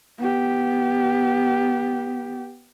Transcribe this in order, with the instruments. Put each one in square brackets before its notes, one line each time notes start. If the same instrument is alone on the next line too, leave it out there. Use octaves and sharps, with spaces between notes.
[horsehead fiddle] B3 G4